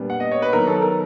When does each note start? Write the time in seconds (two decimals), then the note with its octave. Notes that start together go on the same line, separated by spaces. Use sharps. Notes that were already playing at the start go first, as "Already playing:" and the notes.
Already playing: A#2 G3 B3 D4
0.10 F#5
0.20 D#5
0.31 C#5
0.42 B4
0.53 D#3 F#3 B3 A#4
0.67 A4
0.82 A#4